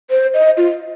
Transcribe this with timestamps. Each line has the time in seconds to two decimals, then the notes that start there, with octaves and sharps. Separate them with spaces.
0.10 C5
0.34 D#5
0.57 F4